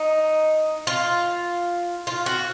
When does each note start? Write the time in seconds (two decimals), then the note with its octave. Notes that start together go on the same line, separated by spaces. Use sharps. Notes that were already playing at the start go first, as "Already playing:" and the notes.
Already playing: D#4
0.87 F4
2.07 F4
2.26 F#4